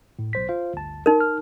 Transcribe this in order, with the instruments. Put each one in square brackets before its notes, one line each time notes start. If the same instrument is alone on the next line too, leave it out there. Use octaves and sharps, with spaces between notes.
[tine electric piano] A2
B1 C5 B6
F4 C5 F5
G1 D2 A5
[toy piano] D#4 A#4
[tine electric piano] F6